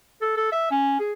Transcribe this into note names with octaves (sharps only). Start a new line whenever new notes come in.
A4
A4
E5
C#4
G#4